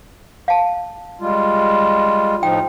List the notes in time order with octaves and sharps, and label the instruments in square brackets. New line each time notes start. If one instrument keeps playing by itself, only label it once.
[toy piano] F5 A5
[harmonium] G3 G#3 F4
[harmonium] A2 F3 D#4 [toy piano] G5